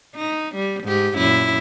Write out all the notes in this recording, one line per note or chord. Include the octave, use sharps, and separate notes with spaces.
D#4
G3
G#2 G4
F#2 A#2 E4